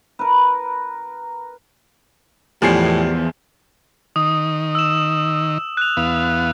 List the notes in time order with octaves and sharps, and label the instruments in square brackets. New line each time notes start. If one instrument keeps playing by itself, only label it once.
[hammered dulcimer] A#4 B4
[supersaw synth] E2 [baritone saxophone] A2 [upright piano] F3 G#5 C7 [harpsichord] G3
[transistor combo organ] D#3 [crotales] D#6
[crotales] E6 E7
F#6 F7
[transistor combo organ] E2 B3 F5